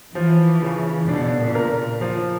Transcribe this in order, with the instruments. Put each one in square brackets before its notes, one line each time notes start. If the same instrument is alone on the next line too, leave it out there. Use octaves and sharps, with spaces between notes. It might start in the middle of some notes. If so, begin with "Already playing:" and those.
[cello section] E3 [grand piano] F3
[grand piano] C#3
[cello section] B2 [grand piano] D4
[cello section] A#2
[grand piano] A#4
F3